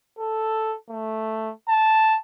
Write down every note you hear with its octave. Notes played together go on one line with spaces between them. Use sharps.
A4
A3
A5